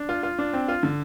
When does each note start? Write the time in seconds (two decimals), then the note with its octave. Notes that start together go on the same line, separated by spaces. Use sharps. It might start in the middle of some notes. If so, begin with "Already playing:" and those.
Already playing: D4
0.09 F4
0.23 F4
0.39 D4
0.53 C4
0.68 F4
0.83 D3